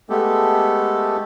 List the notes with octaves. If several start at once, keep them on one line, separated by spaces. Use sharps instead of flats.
G#3 A3 B3 G4 A4